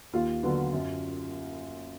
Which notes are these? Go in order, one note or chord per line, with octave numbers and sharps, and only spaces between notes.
D#2 F4
D3 F#3 B3
F#2